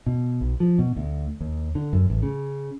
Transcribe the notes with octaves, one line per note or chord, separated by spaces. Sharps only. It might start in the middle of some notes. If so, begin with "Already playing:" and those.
B2
B1
F3
B2
D2
D#2
D3
F#2
A1
C#3